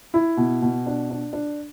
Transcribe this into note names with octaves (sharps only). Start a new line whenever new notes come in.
E4
B2
B2
D4
D4
D4